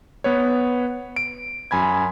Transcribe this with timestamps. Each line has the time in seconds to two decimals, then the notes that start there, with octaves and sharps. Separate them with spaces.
0.24 B3 B4 C#5
1.16 D7
1.71 F#2 G#5 B5 G#6